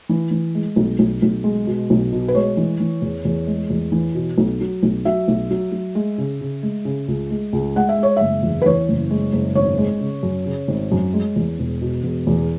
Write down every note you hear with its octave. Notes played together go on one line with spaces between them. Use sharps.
E3
E3
G#3
B1
B1
B1
G#3
B2
B1
B2
B4
G#3 C#5
E3
E3
E2
E2
G#3
E2
E3
B2
B1
F#3
B1
F#3 E5
B1
F#3
F#3
G#3
C#3
C#3
G#3
C#3
C#2
G#3
C#2
G#3 F#5
E5
G#3 C#5
F#1 E5
E2
B4
E3 C#5
F#1
G#3
F#1
G#1 C#5
G#3
C#3
F#2
C#3
G#1
F#2
G#3
E2
E1
B2
E1
E2